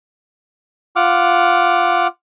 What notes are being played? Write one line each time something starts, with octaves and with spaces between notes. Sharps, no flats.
F4 F#5 D6 F6